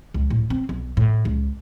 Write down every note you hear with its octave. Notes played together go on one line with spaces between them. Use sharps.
C#2
A2
C4
B1
A2
C#2